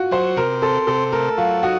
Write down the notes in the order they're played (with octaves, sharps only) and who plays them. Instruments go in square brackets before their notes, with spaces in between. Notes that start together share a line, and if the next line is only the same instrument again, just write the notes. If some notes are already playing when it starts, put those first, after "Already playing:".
Already playing: [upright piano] F4 F#4
[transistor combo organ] F#3 [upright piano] C5
[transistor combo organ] C3 [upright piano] A#4
[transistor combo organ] C4 [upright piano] A4
[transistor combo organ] C3 [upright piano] A4
[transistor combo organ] A3 [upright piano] A#4
[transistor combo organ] F#3 [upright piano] F4
[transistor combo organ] D#4 [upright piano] F#4